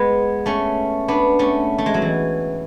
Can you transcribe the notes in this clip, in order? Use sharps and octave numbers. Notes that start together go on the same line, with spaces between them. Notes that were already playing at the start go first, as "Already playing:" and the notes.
Already playing: G#3 B3
A3 C#4
B3 D4
A3 C#4
A3
G#3
F#3
E3